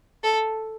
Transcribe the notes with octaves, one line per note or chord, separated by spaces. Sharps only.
A4